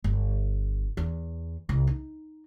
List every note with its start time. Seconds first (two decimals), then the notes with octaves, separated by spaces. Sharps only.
0.04 G1
0.97 E2
1.69 C2
1.87 D#4